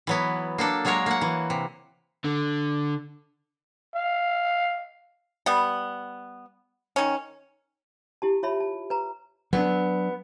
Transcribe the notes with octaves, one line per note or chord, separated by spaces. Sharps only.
E3 F#3 B3
A#3 D4 A4
F#3 G#3 A#3 A#4 C#5
A#3 F#5
E3
C3
D3
F5
G3 B3
D#3 C#4
E4 G4 A5
F4 C#5 E5 A5 B5
A5
B4 A#5
F#3 B3 C4 D4